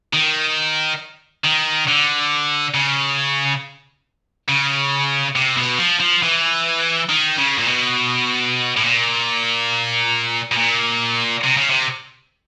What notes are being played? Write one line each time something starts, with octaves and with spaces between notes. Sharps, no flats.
D#3
D#3
D3
C#3
C#3
C3
B2
F3
F3
E3
D#3
C#3
A#2
B2
A2
A#2
B2
A#2
C3
C#3
C3